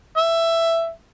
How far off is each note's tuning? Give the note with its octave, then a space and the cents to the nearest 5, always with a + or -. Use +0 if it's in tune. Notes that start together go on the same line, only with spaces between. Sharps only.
E5 +10